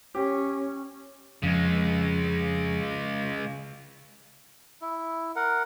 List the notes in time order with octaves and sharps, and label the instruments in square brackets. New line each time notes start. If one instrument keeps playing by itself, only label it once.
[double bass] C#4 [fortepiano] G4
[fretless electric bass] F2 [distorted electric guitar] C#3 G#3
[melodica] E4
A#4 F#5